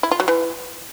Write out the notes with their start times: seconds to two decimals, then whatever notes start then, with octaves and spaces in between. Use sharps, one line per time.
0.03 E4
0.11 F4
0.20 F#3
0.28 E3